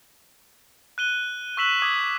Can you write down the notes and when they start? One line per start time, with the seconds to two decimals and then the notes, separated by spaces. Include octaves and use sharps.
0.98 F#6 D#7 G7
1.57 C#6 E6 F#6 B6 E7 F#7
1.82 D6 D#6 G#6 B6